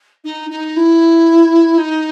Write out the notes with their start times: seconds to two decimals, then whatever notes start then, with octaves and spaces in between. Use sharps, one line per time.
0.24 D#4
0.50 D#4
0.76 E4
1.78 D#4